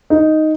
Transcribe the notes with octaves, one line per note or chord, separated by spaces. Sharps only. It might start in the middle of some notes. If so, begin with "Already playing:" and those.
D#4